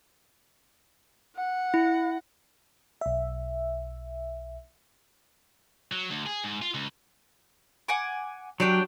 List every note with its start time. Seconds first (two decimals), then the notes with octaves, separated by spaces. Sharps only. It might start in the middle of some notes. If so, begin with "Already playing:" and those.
1.36 F#5
1.74 E4
3.01 B1 E5
5.92 F#3
6.11 D2
6.26 G#4
6.44 G#2
6.62 F4
6.74 C#2
7.88 F#5 G#5 D6
8.60 F#3 D4 G4 G5